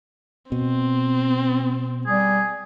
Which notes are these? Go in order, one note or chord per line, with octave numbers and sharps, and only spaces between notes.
B2 C4
G3 G#4